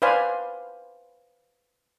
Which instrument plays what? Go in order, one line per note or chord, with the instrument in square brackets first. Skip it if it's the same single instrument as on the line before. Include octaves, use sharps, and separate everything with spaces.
[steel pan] B4 C5 D5 F5 G#5 B5